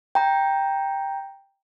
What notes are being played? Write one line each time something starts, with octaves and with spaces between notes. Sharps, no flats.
G5 A#5